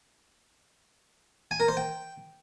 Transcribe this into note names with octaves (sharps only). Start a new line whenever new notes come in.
G#5
A#4
C5
G5